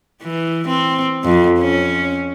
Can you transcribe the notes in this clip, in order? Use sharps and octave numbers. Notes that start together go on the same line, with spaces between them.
E3
C4
F2
C#4